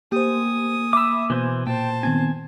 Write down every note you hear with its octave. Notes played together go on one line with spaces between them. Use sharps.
A#3 G4 C5 G#5 D#6
E5 B5 D6 E6
B2 E3 C5 G#5
A#2 C5 G5 A5
D#3 B3 C4 G#5